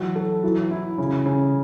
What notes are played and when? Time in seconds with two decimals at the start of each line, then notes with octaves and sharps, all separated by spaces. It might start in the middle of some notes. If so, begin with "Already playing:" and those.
Already playing: E3 F#3 F#4
0.16 A4
0.43 E3 F#3
0.71 E4
0.98 C#3
1.26 C#3